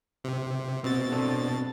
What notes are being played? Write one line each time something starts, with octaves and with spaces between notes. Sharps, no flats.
C3
B2 C4 A6
C4 D4 A4